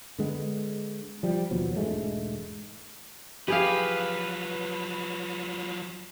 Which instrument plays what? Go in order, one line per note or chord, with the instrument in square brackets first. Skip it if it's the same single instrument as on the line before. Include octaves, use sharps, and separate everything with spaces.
[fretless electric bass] D3 G#3 B3
F3 G3
D#2 B2 F3 F#3
E1 G#2 G#3 A3
[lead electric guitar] F3 F#3 [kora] G4 G#4 F5 [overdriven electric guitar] B4